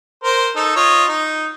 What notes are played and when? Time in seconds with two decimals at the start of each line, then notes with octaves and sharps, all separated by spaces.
0.24 A#4 C5
0.56 D#4 A4
0.76 F4 C#5 D#5
1.08 D#4